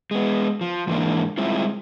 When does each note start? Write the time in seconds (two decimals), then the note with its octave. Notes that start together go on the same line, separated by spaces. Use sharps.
0.11 G#3 B3
0.61 F3
0.88 G#2 E3 G#3 A#3 D4
1.38 G3 G#3 C4 E4 F4